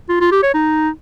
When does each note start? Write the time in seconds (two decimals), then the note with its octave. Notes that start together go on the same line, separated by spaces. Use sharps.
0.09 F4
0.21 F4
0.32 G4
0.43 C#5
0.54 D#4